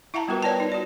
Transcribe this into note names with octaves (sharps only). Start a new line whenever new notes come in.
E4 E5 F#5 A5 A#5
G3 B3 F4 F#4 A#4 B4
B4 C#5 D5 G5 A5
D#4
F#4 D5